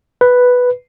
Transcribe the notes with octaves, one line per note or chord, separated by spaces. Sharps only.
B4